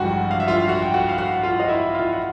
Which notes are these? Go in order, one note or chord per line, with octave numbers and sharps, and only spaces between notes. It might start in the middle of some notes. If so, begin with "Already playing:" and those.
Already playing: A1 G2 D3 F3 G#3 F#4 F#5 G5
F5
E5
F4 F5
F#4 F#5
G5
F#4 F#5
F5
F#4 F#5
F4 F5
D#5
E4 E5
F4 F5
F#5